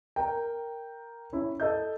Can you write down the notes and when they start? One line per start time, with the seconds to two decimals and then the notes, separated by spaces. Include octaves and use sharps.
0.16 A#4 G5
1.33 C#4 E4
1.60 A4 D#5 G6